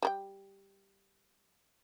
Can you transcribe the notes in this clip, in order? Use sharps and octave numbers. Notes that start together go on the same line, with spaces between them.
G3 A#4 G5